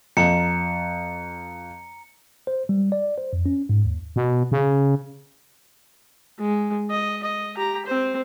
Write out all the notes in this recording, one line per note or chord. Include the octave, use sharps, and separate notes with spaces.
F2 A#5 C#7
C5
G3
D5
C5
F2
C#4
G#2
D#2
B2
C#3
G#3
D#5
D#5
G4 A#5
C4 C5